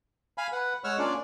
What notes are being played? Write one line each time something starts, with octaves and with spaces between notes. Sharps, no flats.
F5 G#5 B5
B4 F#5
G#3 C#5 F#5 C#6 E6 F6
A#3 C#4 D4 F4 D5